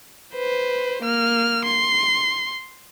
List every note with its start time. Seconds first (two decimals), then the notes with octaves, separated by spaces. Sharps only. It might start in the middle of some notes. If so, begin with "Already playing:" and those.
0.34 B4 C5
1.03 A#3 F6
1.65 C6